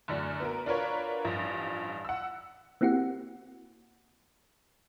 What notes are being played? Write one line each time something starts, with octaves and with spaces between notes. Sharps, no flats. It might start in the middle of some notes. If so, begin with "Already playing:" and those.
F#2 D3 A3 D4 F#4
B3 F#4 A#4
D4 F4 F#4 A#4 B4 C#5
A1 G2 F3
F#5 E6
A#3 C4 E4 F#4 G4 F#5